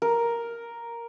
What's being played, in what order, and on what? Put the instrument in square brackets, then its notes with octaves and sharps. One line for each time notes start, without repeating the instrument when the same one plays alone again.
[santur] A#4